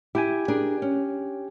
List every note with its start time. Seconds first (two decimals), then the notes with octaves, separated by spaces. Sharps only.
0.15 E4 G4 G5 G#5
0.48 D4 G#4 A#4
0.82 C#4